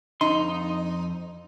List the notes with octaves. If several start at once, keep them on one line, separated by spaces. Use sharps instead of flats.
F2 D#4 C6